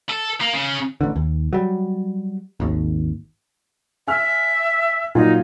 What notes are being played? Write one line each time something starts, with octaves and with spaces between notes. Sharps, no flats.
A4
A#3
C#3
A1 D3
D#2
F#3 G3
G#1 D#2
E5 G#5 F6
A#2 F#3 D#4 F4